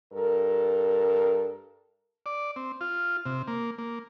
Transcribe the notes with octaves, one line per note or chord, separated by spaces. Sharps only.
G2 A4 A#4
D5
C4
F4
C3
A#3
A#3